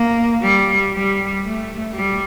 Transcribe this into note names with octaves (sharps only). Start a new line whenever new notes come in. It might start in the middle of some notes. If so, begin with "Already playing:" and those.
Already playing: A#3
G3
G3
A3
G3